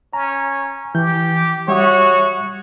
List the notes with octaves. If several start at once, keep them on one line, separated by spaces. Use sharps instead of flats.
C#4 A#5
E3 G4 G6
G3 F#4 C#5 E5 D#6